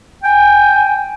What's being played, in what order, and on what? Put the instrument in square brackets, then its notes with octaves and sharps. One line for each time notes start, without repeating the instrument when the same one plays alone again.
[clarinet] G5 [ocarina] G#5